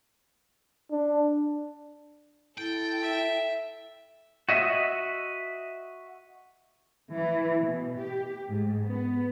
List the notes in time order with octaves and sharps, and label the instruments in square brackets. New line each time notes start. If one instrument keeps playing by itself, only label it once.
[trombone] D4
[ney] E4 [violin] A4 [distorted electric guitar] G5
[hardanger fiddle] E5
[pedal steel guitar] F#4 D#5 E5
[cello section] E3
B2
G4
G#2
B3